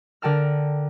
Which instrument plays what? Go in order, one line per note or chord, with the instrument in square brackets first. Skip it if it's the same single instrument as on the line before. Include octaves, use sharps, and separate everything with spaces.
[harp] D3 A#4 G5 A5 F6